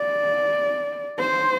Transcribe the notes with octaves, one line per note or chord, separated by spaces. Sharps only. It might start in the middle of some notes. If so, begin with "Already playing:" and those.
Already playing: D5
C5